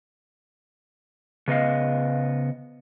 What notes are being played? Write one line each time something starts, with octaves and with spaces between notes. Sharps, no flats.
C#3 B3 D#5 F5